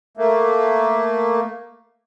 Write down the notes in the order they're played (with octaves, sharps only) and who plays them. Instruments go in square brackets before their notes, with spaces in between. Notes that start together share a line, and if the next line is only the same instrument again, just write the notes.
[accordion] A3 A#3